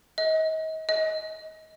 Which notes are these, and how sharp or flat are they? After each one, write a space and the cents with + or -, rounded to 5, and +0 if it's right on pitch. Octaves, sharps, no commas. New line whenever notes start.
D#5 +35
D#5 +25